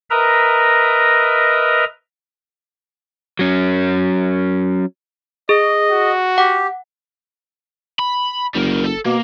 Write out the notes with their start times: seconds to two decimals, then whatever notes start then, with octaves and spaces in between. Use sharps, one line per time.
0.10 A#4 B4 D#5 E5 A#5
3.39 F#3 C#4
5.49 G#4 D#5
5.91 F#4
6.38 G4 F#5
7.99 B5
8.55 F#1 G3 A#4
8.86 A4
9.06 B2 A#3